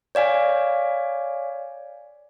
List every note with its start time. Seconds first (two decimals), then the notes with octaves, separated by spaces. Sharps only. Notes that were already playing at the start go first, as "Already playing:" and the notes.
0.15 C#5 D5 F5 G#5